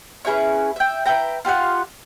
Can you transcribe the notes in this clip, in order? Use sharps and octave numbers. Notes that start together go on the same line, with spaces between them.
C#4 E4 G#4 B4
E5 G5
E4 B4 G5 A#5
F4 G4 F5 F#5